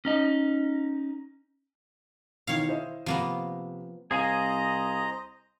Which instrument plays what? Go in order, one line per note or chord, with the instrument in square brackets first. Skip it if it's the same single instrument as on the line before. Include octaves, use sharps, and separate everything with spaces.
[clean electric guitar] C#4 D#4 D#5
[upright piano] B2 D#3 E3 [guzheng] C#5 F5
[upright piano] E4 C5 D#5
[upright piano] C3 [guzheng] F3 A#3 B3
[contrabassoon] C2 [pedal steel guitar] G#4 F5 G#5 [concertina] C5 D#5 A#5